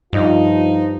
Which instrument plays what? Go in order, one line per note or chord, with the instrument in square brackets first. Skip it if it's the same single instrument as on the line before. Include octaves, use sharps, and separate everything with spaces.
[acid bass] G2 [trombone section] F3 F4 [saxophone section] D#4